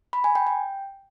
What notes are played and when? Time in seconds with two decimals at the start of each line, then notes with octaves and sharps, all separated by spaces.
0.13 B5
0.24 G#5
0.35 G5
0.47 G5